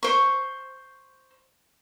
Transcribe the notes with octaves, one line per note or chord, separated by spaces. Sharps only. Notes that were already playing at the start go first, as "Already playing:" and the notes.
C5 C#6